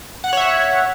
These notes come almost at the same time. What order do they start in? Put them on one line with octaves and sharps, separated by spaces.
F#5 F#6 C#5 E5